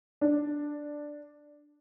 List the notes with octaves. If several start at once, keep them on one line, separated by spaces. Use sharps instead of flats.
D4